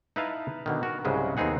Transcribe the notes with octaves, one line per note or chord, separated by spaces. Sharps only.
D#4 E4 B4 E5 F5 A5
B2 D3 D#3
F#4 A#4
C2 G#2 C#3 F#3 G#3 B4
D#2 B3 C4 D#4 G#4 F#5